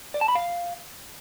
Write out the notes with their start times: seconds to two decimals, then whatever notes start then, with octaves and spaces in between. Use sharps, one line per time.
0.14 D5
0.21 A5
0.28 B5
0.35 F5